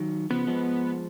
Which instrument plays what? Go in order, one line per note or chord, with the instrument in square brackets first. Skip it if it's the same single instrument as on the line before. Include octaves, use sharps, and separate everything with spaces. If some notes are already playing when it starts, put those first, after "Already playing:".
Already playing: [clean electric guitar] D#3 F#3
[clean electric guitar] C#3 F3 [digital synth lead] B3
[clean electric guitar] F3 G#3